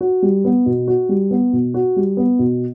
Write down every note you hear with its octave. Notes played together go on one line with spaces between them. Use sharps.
F#4
G3
B3
B2
F#4
G3
B3
B2
F#4
G3
B3
B2